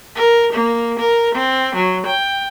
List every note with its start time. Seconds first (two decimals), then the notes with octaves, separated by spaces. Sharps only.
0.16 A#4
0.53 A#3
0.99 A#4
1.35 C4
1.75 F#3
2.07 G5